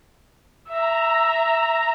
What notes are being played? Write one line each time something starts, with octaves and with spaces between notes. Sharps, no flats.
E5 A#5